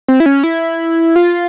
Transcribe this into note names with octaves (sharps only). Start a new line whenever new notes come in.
C4
E4
C#4
E4
F4